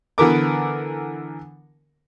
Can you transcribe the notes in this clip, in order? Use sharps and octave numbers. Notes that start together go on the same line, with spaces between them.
D3 E3 B3 A#4 D6